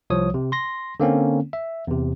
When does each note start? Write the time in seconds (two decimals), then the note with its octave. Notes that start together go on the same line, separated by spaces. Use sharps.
0.10 C2 F3 C#5 D#6
0.34 C3
0.52 C6 A#6
1.00 D3 A#3 C4 C#4
1.53 E5
1.87 E2 C3